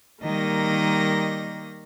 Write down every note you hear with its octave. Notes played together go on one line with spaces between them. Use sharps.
D#3 G3 A#3 D#5 A#6